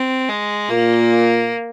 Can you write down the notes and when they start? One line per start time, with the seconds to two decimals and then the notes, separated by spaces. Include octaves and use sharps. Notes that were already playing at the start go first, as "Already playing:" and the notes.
Already playing: C4
0.29 G#3
0.69 A#2 A#3